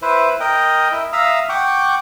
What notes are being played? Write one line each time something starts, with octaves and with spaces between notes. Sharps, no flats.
E4 B4 C5
A#4 D#5 G5
E4
E5 F5 A#5 D#6 E6
F#5 G5 C#6 D6